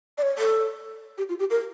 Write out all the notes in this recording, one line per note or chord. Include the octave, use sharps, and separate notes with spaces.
D5
C#5
A4
G4
F4
G4
A#4